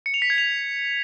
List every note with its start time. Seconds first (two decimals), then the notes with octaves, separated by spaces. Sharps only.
0.06 C#7
0.14 F7
0.22 B6
0.30 G#6
0.38 F7